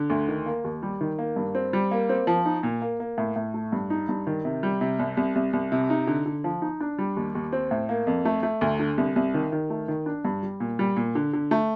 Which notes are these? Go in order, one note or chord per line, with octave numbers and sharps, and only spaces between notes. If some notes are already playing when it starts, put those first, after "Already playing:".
Already playing: D3
D2
D#3
A#3
D#2
G3
D#3
A#3
G2
C4
G3
A#3
C4
F3
D#4
A#2
A#3
A#3
A2
A2
A3
G2
D#4
G2
D#3
C3
G3
C3
C2
C2
C2
C2
C3
D#4
D3
D3
F3
D#4
D4
G3
D#2
D#2
C4
A2
A#3
F2
A3
A3
D2
D3
C2
C2
D#3
D#3
A3
D#3
D4
G2
G3
A#2
G3
A#2
D3
D3
A3